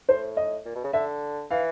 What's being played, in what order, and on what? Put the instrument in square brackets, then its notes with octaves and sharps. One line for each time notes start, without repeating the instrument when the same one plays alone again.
[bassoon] A2 [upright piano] C5
[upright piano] D#5
[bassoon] A#2
B2
C#3
[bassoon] D3 [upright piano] E5
[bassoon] E3 [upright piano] F5